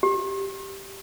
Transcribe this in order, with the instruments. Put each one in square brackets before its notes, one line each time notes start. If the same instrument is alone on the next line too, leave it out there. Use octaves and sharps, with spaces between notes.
[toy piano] G4